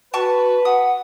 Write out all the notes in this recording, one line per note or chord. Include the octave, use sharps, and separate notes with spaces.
F#4 B4 A5 C#6 F#6
F#5 D#6